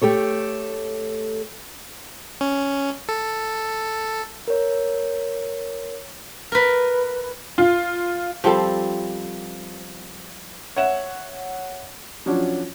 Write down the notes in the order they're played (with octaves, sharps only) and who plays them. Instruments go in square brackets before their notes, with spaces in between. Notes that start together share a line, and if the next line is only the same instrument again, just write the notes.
[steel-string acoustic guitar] A3 G4 A4 C#5
[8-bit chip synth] C#4
A4
[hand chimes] A#4 C#5
[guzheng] A#4 B4
[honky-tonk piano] F4
[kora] F3 G3 C4 A4
[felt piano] C#5 E5 F#5 E7
F3 F#3 C#4 D4